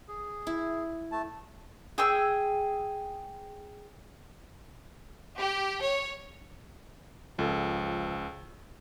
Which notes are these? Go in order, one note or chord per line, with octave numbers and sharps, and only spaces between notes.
G#4
E4
A3 A5
G#4 G5 E6
G4
C#5
C#2 F3 A4